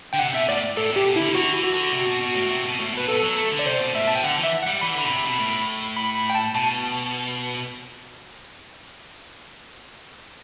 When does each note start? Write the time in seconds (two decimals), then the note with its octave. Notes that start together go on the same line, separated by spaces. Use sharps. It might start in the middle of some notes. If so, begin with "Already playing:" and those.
0.13 D3 G5
0.19 C3 F#5
0.34 B2 E5
0.48 A2 D5
0.77 A2 A4
0.92 C3 G4
1.05 B2
1.16 D3 E4
1.29 C3
1.35 D3 F#4
1.54 E3
1.64 F#4
1.74 D3
1.93 C3
2.07 B2
2.21 B2
2.36 A2
2.50 C3
2.65 B2
2.80 A2
2.94 B2 B4
3.08 B2 A4
3.22 F#3
3.36 A3
3.52 D3
3.59 D5
3.66 C3 C5
3.80 B2
3.94 A2 E5
4.07 B2 A5
4.15 G5
4.23 D3 F#5
4.38 E3
4.43 E5
4.63 G3 F#5
4.81 E3 B5
4.96 D3 B5
5.05 B2
5.10 C3
5.25 B2
5.39 A2
5.97 B5
6.15 B5
6.30 G5
6.35 A5
6.55 B2 A5